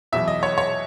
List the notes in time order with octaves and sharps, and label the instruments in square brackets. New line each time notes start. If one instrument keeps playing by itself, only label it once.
[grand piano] E2 B2 F#3 E5
D#5
C#5
C#5